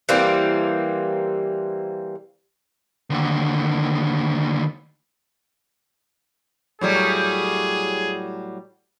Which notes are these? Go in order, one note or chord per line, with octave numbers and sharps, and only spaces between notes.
E3 G3 A#3 C4
D#2 D3
A2 F#3 G3 G#4